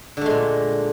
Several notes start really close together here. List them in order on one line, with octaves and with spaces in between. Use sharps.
D3 A3 G#3 A#2